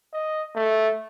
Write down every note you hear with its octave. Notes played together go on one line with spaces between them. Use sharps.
D#5
A3